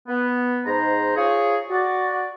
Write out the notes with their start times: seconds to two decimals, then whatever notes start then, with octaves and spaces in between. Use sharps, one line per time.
0.07 B3
0.65 G#2 C5 A#5
1.16 F4 G#4 C#5
1.68 F#4 D5